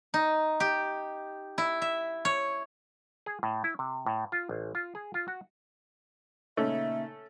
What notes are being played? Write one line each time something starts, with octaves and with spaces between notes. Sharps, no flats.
D#4
G4
E4
E5
C#5
G#4
A2
E4
C3
A2
F4
A1
F4
G#4
F4
F#4
A#2 C#3 A3 C#4 D#4 E5